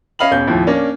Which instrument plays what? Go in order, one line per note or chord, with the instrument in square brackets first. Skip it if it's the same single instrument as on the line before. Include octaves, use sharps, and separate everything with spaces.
[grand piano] C#4 D#5 F5 B5 F#7
E1 C#4 G6
D#2 A2 F3
A#3 C#4 D4